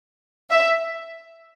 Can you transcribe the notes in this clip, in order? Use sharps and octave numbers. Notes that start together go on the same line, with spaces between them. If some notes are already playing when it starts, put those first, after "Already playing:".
E5